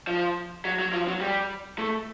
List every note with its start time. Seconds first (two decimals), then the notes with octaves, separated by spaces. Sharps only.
0.07 F3
0.65 F#3
0.79 F#3
0.93 F3
1.08 F#3
1.21 G3
1.78 A3